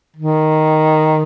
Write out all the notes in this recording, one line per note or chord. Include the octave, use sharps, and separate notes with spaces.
D#3